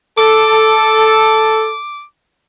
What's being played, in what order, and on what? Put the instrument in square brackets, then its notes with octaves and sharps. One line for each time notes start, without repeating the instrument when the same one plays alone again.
[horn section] A4 [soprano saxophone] D6